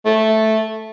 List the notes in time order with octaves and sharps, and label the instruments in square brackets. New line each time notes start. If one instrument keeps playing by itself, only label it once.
[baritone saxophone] A3